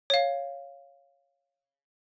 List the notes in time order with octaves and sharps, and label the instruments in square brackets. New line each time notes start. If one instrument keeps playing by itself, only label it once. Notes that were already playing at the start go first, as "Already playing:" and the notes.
[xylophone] C#5 F5